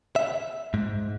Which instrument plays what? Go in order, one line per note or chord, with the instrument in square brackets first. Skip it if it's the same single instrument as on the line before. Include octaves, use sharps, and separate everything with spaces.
[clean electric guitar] E5
G#2